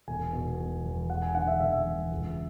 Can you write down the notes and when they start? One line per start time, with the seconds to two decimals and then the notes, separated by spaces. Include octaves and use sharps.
0.08 E1 G#5
0.33 B2
0.59 E1
0.84 E2
1.10 E1 F#5
1.22 G#5
1.35 D3 F#5
1.47 E5
1.60 E1 E5
1.86 E2
2.11 C#2